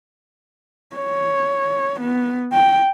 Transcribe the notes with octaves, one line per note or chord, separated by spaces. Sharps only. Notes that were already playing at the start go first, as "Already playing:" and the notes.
C#5
B3
G5